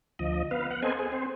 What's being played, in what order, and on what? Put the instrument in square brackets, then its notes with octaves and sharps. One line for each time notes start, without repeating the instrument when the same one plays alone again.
[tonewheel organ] D2 F3 D#5
B3 B4 F5
F#5
B3 C4 A4 C5 D#5 G#5
G#4
C4 C5